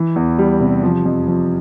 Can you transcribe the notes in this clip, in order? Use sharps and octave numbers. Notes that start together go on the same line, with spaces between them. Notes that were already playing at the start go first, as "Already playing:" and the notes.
Already playing: E3
E2
G3
C3
F3
F2
F2